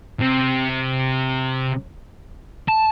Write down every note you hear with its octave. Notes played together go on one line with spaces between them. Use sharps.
C3
A5